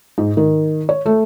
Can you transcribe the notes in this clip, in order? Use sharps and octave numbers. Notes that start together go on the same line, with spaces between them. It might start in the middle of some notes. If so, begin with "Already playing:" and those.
G#2
D#3
C#5
A3